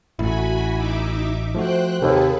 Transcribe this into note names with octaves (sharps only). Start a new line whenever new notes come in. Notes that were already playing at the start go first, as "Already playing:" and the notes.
A1 A3 E4 F#4 G#5 B5
D#4 E5 D6
F3 A3 F#4 C5 G5 F#6
D#2 C3 G#4 A4 B4